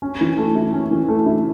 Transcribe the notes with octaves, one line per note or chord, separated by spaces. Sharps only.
C#4
E3
A3
E4
C#4
E3
A3
E4